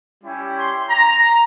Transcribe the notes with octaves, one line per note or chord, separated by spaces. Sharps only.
G3 C#4 E4 G4
C6
A#5